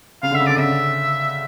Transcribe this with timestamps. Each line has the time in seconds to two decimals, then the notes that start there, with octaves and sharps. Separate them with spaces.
0.23 C#3 F5
0.31 D3 E5
0.40 C#3
0.47 D3 D5
0.57 C#3 E5